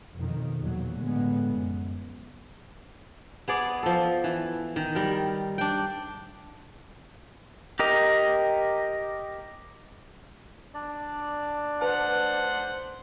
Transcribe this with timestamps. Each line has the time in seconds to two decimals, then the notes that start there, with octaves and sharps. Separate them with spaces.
0.15 F2 B2 D#3
0.59 E2 A#2 F#3
0.99 A2 D3 G#3 B3
1.56 F#2
3.48 B3 G#4 D5
3.83 F3 A4
4.24 E3
4.76 D#3
4.95 G3 A#4
5.58 D4 G5
7.79 G4 A#4 D#5 A#5
10.74 D4 D5
11.81 B4 C5 F#5 A5